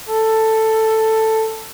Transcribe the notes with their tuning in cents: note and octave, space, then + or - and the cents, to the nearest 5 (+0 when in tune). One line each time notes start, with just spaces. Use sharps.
A4 +5